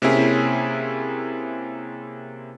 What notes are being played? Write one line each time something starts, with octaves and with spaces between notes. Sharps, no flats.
C3 A#3 C4 C#4 E4 G#4